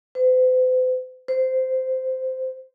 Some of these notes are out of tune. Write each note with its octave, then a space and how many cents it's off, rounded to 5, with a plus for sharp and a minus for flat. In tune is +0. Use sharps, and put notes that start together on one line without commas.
C5 -45
C5 -10